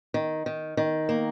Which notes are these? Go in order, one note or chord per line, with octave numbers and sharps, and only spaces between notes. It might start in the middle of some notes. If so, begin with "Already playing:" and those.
D#3
D#3
D#3
A#3